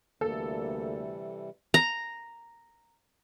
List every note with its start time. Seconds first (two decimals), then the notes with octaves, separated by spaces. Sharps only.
0.21 D2 C3 E3 G3 A#3 A4
1.74 A#5